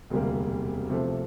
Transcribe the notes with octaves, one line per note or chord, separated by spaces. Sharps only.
E1 D2 C3 G3 A#3
C3 F3 A3 C4